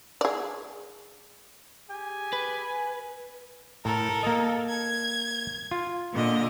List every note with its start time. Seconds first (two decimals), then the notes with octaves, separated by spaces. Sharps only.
0.21 G#4 D5
1.89 G4 G#4 G#5
2.33 B4
2.64 G#5
3.85 A2 A4 A#4
4.23 A#3 D#5
4.69 G#6
5.71 F4
6.13 A#2 D3 D#5